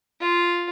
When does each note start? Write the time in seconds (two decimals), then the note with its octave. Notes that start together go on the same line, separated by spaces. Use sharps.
0.21 F4